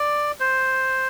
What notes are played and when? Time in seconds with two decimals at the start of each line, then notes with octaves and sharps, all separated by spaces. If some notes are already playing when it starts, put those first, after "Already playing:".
Already playing: D5
0.40 C5